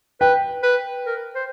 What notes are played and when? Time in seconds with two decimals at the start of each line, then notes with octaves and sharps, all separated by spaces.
0.21 B4 G5
0.63 B4
1.07 A#4
1.35 C5